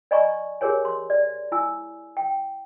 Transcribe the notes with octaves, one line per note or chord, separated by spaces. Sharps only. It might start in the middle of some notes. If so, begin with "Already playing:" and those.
D5 D#5 G#5 A#5 B5 C#6
G4 G#4 A#4 C#5 G#5
C6
D5
E4 G#5 E6
G5